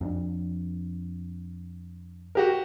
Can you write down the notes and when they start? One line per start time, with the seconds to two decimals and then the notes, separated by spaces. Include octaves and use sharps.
0.01 F2 C4 D4
2.35 F#4 G4 A#4